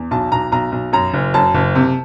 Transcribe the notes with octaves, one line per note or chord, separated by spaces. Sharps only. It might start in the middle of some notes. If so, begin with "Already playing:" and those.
Already playing: E2
B1 A5
B1 A#5
B1 A#5
B1
F#2 A#5
F#1
F#2 A5
F#1
C3